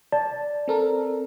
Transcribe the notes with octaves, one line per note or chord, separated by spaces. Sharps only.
D5 A5
C4 A4 A#4